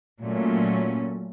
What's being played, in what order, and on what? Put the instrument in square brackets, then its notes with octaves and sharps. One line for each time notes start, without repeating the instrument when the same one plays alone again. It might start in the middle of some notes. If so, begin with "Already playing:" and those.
[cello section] A#2 F#3 A3 C#4